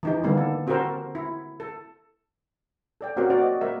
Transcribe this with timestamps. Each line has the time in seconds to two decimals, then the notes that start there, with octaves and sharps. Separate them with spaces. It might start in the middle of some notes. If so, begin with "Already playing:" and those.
0.03 E3 D#4 G4
0.23 D3 D#3 G3 A#3 B3
0.37 A4
0.67 C4 F#4 G4 A4 A#4 C5
1.15 E4
1.60 A4
3.01 A4 D5 G5
3.17 A#3 C4 C#4 F#4 G4 A#4
3.30 F#4 C5 D5
3.42 D#5
3.61 A#3 A#4 E5